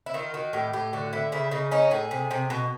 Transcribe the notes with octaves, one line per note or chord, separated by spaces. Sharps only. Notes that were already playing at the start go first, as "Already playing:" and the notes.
E4
D#3 F4
D#3 F#4
A2 G4
A2 G4
D3 F#4
D3 E4
C#3 E4
C#3 D#4
C#4 D#4
A2 G#4
C3
C3
B2